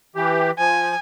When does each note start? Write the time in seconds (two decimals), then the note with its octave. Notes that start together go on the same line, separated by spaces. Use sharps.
0.16 E3 G4
0.59 F3 G#5